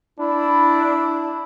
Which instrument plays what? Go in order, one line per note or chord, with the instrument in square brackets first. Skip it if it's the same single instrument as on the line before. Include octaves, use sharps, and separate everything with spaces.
[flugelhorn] D4 [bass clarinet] E4